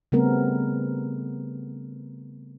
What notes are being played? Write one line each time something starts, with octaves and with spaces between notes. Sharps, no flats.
C#3 G3 A3 B3 C4 A#4